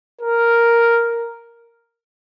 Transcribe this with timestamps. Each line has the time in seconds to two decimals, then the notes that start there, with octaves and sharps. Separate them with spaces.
0.21 A#4